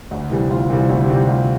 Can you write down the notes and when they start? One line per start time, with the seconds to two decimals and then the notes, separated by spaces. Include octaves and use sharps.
0.11 D2
0.30 C3 E3 G3
0.50 D2 F4
0.69 C3 E3 G3 F4
0.89 D2 E4
1.03 G4
1.09 C3 E3 G3
1.16 G4
1.28 D2 F4